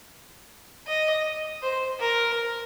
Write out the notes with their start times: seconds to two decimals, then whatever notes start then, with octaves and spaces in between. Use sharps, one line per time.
0.87 D#5
1.62 C5
2.00 A#4